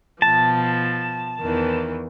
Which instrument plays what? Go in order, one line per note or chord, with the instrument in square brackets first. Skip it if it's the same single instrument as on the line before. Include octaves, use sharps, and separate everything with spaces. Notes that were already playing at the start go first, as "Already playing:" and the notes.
[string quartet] B2 F3 [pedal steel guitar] A5
[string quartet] E2 D#3 E3